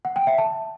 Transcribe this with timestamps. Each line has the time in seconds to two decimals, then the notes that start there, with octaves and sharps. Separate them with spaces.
0.05 F#5
0.16 G5
0.27 E5
0.38 A5